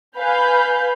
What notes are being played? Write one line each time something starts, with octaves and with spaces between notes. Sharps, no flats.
B4 F5 G#5 B5 G6